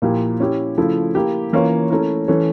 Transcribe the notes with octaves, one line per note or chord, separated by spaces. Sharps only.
A#2 F3 A#3 E4 G4
C#4 E4 G4
C#3 F3 A3 E4
A#3 E4 G4
E3 A#3 C#4 F4 C#5
A3 C#4 E4 A#4
E3 A3 C#4